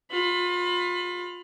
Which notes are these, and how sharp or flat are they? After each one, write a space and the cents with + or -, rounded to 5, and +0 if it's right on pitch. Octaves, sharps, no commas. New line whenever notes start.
F4 +30 B5 +25